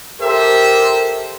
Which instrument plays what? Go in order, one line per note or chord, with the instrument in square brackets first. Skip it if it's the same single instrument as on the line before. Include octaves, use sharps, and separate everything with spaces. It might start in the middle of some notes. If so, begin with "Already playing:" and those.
[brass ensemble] G4 A4 A#4 C5 E5